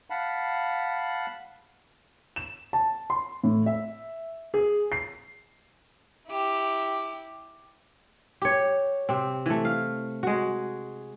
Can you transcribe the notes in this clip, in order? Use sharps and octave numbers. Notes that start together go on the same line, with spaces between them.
F5 F#5 A5 B5
E7
A5
C6
A2
E5
G#4
C7
E4 G4
G4 C#5
C3 C4
E3 A3
F5
G#3 F#4